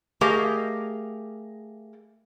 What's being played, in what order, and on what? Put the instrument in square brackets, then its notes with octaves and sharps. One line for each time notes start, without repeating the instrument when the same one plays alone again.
[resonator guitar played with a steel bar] A3 G4 G#4 A#4 D#5 F5